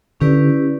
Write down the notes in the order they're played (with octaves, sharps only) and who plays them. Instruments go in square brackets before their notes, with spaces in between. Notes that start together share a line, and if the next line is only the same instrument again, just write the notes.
[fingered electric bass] D3 [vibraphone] C#4 E4 G4 B4 D5